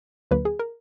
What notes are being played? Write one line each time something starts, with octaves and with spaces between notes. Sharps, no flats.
D2 D3 F#3 A#3 B4
G#4
A#4